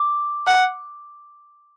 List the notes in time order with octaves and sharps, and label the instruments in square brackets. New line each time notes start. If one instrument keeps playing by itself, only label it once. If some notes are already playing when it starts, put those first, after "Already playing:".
Already playing: [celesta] D6
[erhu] F#5